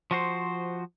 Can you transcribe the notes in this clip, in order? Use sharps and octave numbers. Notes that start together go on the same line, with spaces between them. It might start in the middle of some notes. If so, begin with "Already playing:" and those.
F3 F#4 C5